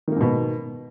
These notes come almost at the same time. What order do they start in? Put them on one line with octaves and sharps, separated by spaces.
D#3 A#3 G#2 B2